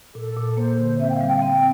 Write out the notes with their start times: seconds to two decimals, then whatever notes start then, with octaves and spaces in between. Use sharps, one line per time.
0.15 A#2 A4
0.36 A#2
0.57 A#3 C5
0.78 D3
0.99 C4 E5
1.09 G5
1.14 F5
1.21 G3
1.28 G5
1.36 F5
1.42 C4 G5